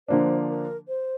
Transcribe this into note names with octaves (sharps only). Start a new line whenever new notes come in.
D3 F3 A#3 D4 C5
A#4
C5